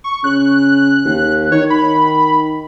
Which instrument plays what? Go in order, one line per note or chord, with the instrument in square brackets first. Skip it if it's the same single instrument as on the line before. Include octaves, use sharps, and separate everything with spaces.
[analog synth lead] C#6
[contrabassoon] C#3 [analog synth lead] F#6
[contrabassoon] D#2
[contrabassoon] D#3 [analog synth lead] C#5
[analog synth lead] B5